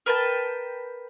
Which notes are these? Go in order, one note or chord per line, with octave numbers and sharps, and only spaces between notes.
A#4 B4 G5 A5